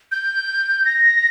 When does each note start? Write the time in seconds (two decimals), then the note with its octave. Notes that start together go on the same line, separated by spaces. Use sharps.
0.12 G6
0.85 A#6